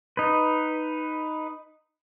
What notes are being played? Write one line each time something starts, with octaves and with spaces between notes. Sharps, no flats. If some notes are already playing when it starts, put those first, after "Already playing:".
D#4 B4